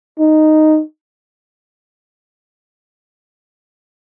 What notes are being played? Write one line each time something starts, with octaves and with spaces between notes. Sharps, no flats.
D#4